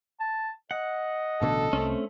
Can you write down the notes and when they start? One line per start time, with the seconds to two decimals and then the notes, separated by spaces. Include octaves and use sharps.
0.20 A5
0.71 D#5 F#5
1.42 A1 B2 D3 A4
1.73 C2 A3 C4 C#4